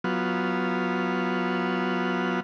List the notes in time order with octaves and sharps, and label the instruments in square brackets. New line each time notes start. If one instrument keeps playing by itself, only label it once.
[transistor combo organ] F#3 B3 F4